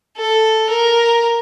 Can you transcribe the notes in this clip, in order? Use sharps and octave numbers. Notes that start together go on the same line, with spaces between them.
A4
A#4